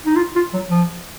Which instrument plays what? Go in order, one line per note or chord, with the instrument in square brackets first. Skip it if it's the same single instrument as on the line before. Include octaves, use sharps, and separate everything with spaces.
[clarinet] D#4
F4
F4
F#3
F3